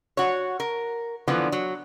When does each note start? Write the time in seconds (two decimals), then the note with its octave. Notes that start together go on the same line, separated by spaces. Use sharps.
0.17 F#4 C#5
0.60 A#4
1.28 D3 E3 F3 B3
1.52 F#3